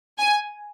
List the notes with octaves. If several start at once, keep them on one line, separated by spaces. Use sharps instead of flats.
G#5